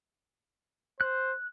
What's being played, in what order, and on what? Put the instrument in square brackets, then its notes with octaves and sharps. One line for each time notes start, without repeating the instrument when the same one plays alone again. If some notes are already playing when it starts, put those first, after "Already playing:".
[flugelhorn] C5 [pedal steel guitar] F#6